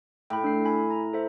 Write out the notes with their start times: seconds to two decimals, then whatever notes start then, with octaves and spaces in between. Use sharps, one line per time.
0.30 A2 G5 B5
0.44 D4 C7
0.65 G#5 B5
0.90 A#5
1.13 A4 C5 E5